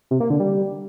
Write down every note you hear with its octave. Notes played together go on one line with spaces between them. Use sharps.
C3
A#3
D3
G3